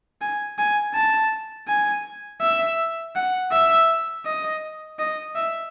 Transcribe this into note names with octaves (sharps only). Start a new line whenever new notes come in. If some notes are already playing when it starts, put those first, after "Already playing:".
G#5
G#5
A5
G#5
E5
F#5
E5
D#5
D#5
E5